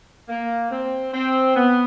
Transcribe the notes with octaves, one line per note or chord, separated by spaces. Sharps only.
A#3
C4
C4
B3